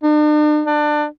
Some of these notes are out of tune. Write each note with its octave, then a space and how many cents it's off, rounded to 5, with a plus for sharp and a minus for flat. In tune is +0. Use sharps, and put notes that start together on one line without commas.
D4 +45
D4 +25